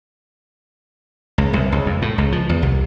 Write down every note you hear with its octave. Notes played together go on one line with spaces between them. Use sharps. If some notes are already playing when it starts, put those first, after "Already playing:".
C#2
C2
C#2
F2
A2
C#2
F3
E2
C2